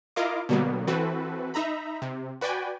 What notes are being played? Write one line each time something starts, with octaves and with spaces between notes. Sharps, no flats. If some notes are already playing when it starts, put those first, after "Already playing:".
E4 F4 A#4 D#5 F5 D6
B2 D3 F#3 G3 A#3 B3
E3 C4 F#4 A4 B4
D#4 E5 A#5 B5
C3
F#4 B4 D5 G5 G#5